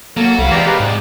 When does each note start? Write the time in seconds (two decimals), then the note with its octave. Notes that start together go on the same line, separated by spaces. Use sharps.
0.17 F#3 A#3 F#4 A4
0.39 C2 F5 B5
0.51 C3 E3 G#3 G4 D5 A#5
0.67 G4 A#4 B4
0.80 G#2 D5 G5